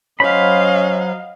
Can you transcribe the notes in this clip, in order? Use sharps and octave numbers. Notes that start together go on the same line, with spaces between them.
F#3 C#4 C5 D#5 F5 B5